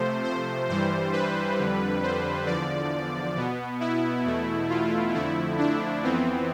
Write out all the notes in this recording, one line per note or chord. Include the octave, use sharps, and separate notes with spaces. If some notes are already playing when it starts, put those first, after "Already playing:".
Already playing: C3 F3 A3 C5
C5
G2 E3 G3 C5
B4
F2 D3 G3
C5
E2 D3 F3 D5
B2 B3
E4
E2 B2 A3
F4
F2 D3 F3 A3 E4
D4
F2 E3 B3 C4